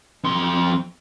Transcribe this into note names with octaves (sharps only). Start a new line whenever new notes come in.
F2 C6